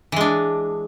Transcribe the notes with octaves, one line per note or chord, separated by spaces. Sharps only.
E3 G#3 D4